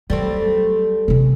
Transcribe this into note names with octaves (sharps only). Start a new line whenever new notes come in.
F#3 G3 A3 C4
C3 E3